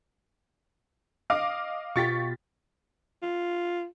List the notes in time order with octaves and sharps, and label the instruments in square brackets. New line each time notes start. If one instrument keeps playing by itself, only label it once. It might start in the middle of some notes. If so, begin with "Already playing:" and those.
[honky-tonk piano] D#5 F5 D6
[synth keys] B2 F4 G4 [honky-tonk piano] C#6 A6 B6
[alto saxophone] F4